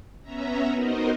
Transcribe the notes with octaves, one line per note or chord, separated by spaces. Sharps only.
B3 C#4 E5 A#5
B3 D#4 F#4 A#4 C5 D#5